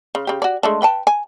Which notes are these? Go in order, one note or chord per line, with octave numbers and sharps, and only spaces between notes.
C#3
C#3 G4
F#4 D5
G#3 A3 D4
B4 G5 A5
G#5